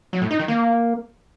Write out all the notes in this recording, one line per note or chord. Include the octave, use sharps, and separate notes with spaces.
F#3
A2
D#4
D#3
A#3